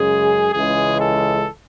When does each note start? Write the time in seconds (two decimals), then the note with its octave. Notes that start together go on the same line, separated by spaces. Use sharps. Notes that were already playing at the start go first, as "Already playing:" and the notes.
Already playing: F#2 C#3 G#3 G#4
0.53 C#2 C#3 E3 G#3 G#4
0.99 A4